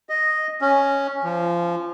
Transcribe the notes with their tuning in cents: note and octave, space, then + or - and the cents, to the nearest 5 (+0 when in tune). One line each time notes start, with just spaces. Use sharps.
D#5 -5
C#4 +0
F3 -20